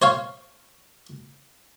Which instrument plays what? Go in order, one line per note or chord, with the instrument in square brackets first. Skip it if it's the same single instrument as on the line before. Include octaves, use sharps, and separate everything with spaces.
[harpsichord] C5 C#5 F5